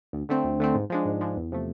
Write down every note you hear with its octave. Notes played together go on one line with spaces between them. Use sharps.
D2
D3 A3 C4
D2
D3 A3 C4
G#2
F3 G#3 D4
G#2
F3 G#3 D4
E2
C3 F3 A3